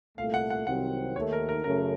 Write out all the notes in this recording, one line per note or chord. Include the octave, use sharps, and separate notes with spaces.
C2 A#2 A3 F5
F#5
F#5
C2 C3 D#3 F#3 C4 F#5
D#2 D#3 A3 C#5
A#4
A#4
F#2 C#3 A3 A#4